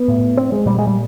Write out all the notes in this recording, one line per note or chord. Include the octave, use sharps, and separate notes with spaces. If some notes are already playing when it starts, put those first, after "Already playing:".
Already playing: B3
A2
C4
G#3
A#2 G3
G#3
G3